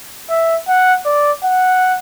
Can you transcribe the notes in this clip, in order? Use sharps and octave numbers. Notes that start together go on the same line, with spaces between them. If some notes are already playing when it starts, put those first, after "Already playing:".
E5
F#5
D5
F#5